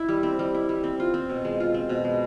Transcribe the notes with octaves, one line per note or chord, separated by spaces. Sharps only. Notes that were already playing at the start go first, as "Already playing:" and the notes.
Already playing: E4
G3
C4
G3
E4
G3
C4
F4
C4
B2
G#3
F4
C4
B2
G#3